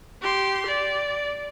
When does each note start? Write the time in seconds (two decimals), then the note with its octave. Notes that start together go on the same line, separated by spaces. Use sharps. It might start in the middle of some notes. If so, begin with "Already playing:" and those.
0.22 G4 C6
0.67 D5